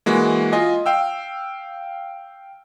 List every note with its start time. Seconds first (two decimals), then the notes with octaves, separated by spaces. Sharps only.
0.06 E3 G#3 A#3 F#4
0.52 F4 D#5 G#5
0.86 F5 G5 E6